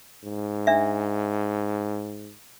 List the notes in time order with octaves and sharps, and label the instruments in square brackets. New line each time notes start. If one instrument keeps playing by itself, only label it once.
[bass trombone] G#2
[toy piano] D4 E5